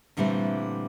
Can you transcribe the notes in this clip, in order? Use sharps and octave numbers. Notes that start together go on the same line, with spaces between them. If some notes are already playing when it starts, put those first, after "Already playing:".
A#2 D3 E3 G3 A3 C4